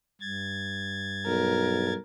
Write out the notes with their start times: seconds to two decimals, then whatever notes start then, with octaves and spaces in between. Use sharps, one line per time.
0.21 G2 G#6 A6
1.26 B1 A#4